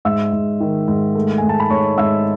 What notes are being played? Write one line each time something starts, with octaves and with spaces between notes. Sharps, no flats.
G#2 E5 E6
G#2
D#3
G#2
A3
G#2 G#5
A5
B5
G#2 C#5 C#6
G#2 E5 E6